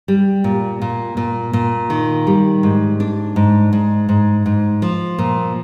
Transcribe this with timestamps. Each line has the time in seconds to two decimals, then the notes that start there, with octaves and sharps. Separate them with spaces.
0.08 G3
0.44 A#2
0.82 A#2
1.17 A#2
1.53 A#2
1.90 D#3
2.27 G3
2.63 G#2
3.00 D4
3.36 G#2
3.73 G#2
4.09 G#2
4.46 G#2
4.82 F3
5.19 A#2